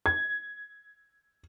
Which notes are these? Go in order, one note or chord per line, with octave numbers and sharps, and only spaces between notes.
G#6